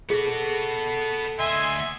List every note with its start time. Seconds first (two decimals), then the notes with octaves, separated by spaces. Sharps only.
0.10 B3 F#4 G#4 A4
1.39 D2 D#5 E5 G#5 C6